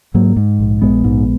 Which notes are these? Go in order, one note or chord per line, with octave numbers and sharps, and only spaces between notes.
G#2 F#3 A#3
G#2
A#1
A#1 G#3 B3
G#2